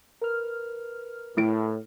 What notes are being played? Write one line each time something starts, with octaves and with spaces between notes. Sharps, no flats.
A#4 B4 F6
A2 A3 E4 D7